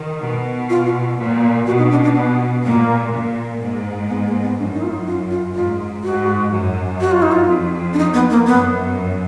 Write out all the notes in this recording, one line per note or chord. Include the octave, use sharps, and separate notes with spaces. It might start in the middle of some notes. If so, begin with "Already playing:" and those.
Already playing: D#3
B2
F4
F4
A#2
B2 F#4
D#4
D4
D4
B3
A#2 A#3
A#2
G#2 A#3
B3
A#3
B3
F#2 D4
D#4
F4
D#4
F4
F4
G#2 F4
G#2 F#4
F#2
F#4
F4
D#4
F4
F2
D4
D#4
B3
A#3
F#2 B3